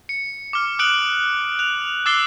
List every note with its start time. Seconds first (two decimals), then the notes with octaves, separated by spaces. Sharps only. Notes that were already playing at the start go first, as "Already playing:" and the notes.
0.09 C#7
0.53 D6 F6
0.79 D#6 F#6 D7 F#7
1.59 F#6 F7
2.06 D6 E6 F#6 A6 C7 G7